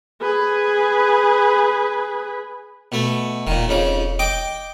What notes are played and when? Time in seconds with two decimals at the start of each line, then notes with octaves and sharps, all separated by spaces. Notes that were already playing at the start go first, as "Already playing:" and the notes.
0.21 G#4 B4
2.92 B2 A3
3.47 E1 A#2 D#3
3.68 F2 C#3 D#4
4.19 D#5 G5 D6